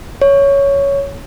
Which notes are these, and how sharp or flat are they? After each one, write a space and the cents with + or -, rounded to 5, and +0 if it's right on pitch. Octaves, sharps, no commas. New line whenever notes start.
C#5 +10